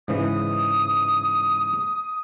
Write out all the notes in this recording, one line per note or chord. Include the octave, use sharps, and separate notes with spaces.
G#2 C#3 E3 D#6